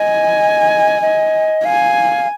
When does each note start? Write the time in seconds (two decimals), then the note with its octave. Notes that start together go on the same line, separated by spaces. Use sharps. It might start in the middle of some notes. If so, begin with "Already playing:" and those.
Already playing: D#5 G#5
1.02 D#5
1.65 F5 G#5